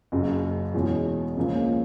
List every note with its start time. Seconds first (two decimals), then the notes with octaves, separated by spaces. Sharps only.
0.12 F#1 F#2 C#3
0.74 E2 B2 G#3 C#4
1.37 C#2 C#3 F3 A#3 C#4